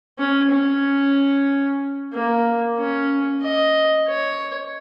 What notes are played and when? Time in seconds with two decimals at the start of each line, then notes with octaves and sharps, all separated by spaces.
0.19 C#4
0.51 C#4
2.13 A#3
2.78 C#4
3.42 D#5
4.08 C#5